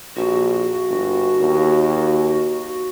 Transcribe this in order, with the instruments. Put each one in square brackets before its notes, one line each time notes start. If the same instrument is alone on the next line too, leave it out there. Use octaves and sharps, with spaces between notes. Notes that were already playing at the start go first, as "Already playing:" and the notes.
[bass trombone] A#1 [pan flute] F#4
[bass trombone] G1
D#2